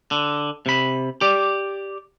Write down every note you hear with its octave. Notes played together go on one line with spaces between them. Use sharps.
D3
C3 B5
G4 D5